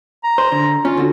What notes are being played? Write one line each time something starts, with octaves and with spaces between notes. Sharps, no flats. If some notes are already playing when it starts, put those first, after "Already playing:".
A#5
C5
D3
C#4 F4
D3 F#4